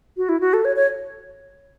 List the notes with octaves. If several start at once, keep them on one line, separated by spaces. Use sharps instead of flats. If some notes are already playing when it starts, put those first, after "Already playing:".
F#4
E4
F#4
A4
C#5
C#5